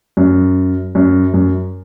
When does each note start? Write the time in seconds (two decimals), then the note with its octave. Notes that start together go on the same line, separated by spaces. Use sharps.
0.17 F#2
0.95 F#2
1.34 F#2